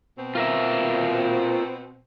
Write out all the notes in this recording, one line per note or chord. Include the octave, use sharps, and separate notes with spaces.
B2 C4
F4 A#4 E5